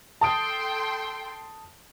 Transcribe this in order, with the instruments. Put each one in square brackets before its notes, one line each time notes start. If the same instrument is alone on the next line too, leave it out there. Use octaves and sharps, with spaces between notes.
[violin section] A4 G5 C6 [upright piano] A5 D#6 D7